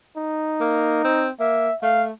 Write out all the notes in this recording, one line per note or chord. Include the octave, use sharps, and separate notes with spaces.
D#4
A#3
C4
A#3 E5
A3 F5